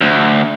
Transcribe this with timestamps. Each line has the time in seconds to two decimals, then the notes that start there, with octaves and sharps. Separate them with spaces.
0.01 D2